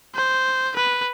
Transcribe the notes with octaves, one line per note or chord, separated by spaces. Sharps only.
C5
B4